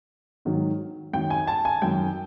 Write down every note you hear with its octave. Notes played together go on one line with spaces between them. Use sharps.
G#2 D#3 F#3
F#2 D#3 F#3 G5
G#5
A5
G#5
F#2 D#3 F#3 G5